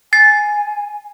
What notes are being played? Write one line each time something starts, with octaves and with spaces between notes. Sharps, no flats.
G#5 A6 C7